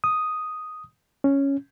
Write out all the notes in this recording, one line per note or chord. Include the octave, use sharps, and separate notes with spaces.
D#6
C#4